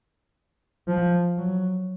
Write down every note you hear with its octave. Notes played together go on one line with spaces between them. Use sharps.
F3
F#3